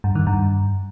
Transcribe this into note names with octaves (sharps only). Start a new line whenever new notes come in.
G2
D#3
G2